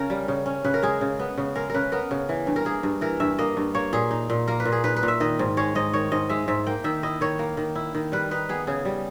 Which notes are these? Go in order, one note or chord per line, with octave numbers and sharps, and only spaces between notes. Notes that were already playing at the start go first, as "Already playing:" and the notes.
Already playing: C#3 C#4 A#4
G3
C#3
C#4
C#3 B4
A#4
G#3 G#4
C#3
B3
C#3
G#3 A#4
C#3 A#4 B4
B3 A#4
C#3
E3
G2
A#4
A#3 G#4
G2
E3 A#4
G2 E5
A#3 D#5
G2
A#3 C#5
A#2 G#4
D#4
A#2
A#3 A#4
B4
A#2
G#4
D#4 B4
B4
A#2
E5
D#3 D#5
G#2
G#3 C#5
G#2 D#5
D#3 C#5
G#2 D#5
G#3 E5
G#2 E5
A#3 G5
D#3 E5
E4 D#5
D#3 C#5
A#3
D#3
E4
D#3
G3 B4
D#4 B4
B3 G#4
C#3 G#4
G3